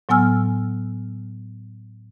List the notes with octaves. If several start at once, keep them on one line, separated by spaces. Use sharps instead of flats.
A2 F#3 B3 G#5 E6 F6